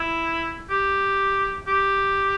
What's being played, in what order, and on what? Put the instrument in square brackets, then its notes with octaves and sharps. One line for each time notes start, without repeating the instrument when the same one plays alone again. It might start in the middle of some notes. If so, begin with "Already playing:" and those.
Already playing: [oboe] E4
G4
G4